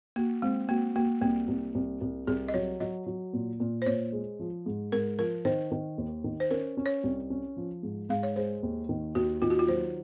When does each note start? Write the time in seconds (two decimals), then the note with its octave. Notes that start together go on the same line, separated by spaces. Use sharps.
0.16 A#3 F#4
0.42 G#3 C4
0.68 A#3 F#4
0.96 A#3 F#4
1.21 C2 A#3
1.48 C2
1.75 C2
2.01 C2
2.27 C2 G#4
2.48 D#5
2.54 F#3 C#5
2.80 F#3 D#5
3.06 F#3
3.33 A#2
3.60 A#2
3.82 C5
3.86 A#2 C#5
4.12 G#3
4.39 F3
4.66 G#2
4.92 G#2 A#4
5.19 F3 A#4
5.45 D#3 C5
5.71 D#3
5.98 D#2
6.24 D#3
6.40 C5
6.50 C#4 A#4
6.77 C#4
6.86 C#5
7.04 C2
7.30 C#4
7.57 F3
7.83 G#2
8.09 G#2 F5
8.23 C#5
8.36 G#3 C5
8.63 D#2
8.89 D#3
9.15 D#2 F#4
9.42 D#3 F4
9.50 F#4
9.59 F4
9.68 F#3 C5